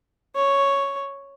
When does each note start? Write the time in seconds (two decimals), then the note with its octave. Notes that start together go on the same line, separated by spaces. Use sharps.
0.35 C#5